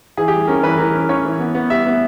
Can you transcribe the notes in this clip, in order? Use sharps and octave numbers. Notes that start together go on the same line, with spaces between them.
E3 G#4
G4
G3
C#4 A#4
E3 B4
E3 A#4
C#4
C#4 C#5
E3
B3
B3
G3 E5
B3